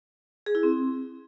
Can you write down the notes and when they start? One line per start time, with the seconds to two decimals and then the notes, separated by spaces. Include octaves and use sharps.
0.46 G#4
0.55 E4
0.63 C4